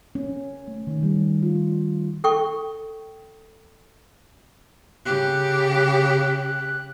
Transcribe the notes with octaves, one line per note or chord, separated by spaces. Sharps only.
C#4
A3
D#3
G3
F4
A4 G5 C#6
C#3 G4 F#6